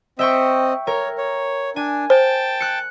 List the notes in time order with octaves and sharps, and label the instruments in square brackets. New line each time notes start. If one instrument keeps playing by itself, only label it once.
[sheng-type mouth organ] C4 D#5 [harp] E5 G5 C#6
[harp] A#4 [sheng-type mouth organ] C#5
[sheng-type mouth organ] C#5
[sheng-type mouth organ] D4 [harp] G#5
[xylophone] C5 [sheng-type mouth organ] G5 A5
[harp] F#6 C#7